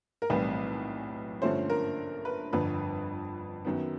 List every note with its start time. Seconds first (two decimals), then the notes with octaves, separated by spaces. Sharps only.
0.22 A#4
0.30 B1 A2 E3 G3 C4 B4
1.42 G2 D3 F3 A3 C#4 C5
1.70 A#4
2.25 B4
2.53 G1 F2 D3 B4
3.65 F#2 D#3 F#3 B3